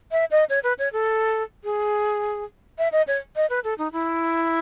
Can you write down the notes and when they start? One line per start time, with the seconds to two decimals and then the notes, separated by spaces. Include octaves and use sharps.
0.12 E5
0.31 D#5
0.49 C#5
0.63 B4
0.79 C#5
0.93 A4
1.64 G#4
2.78 E5
2.92 D#5
3.07 C#5
3.36 D#5
3.50 B4
3.64 A4
3.78 D#4
3.92 E4